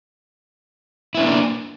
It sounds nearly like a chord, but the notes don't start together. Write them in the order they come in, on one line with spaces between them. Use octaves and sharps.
E4 B3 C#4 A#3 D4